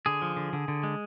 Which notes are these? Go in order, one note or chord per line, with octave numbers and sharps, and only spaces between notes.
D3 G#4
F3
D3
D3
D3
G#3